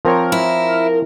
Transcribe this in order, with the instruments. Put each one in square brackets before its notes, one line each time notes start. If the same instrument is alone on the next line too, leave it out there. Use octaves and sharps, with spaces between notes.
[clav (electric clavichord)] F3 C4 C#5 [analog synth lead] A#4
[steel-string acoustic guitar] E4